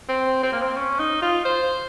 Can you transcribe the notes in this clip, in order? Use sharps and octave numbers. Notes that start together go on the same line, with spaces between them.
C4
C4
A#3
C4
C#4
D#4
F4
C5